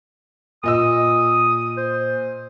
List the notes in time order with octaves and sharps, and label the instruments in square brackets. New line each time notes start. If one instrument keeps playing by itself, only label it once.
[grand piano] A#2 D#5 E6 [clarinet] D#6
[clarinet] C5